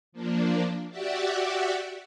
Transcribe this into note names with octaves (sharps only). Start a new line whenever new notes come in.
F3 A#3 D4
F#4 G4 D5 E5 F#5